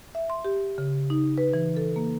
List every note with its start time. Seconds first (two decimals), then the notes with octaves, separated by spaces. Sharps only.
0.15 E5
0.30 C6
0.45 G4
0.78 C#3
1.10 D#4
1.38 B4
1.54 E3
1.77 A4
1.96 A#3